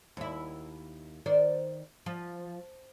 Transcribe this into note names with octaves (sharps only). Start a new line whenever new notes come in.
D#2 E4
D#3 C5 D5
F3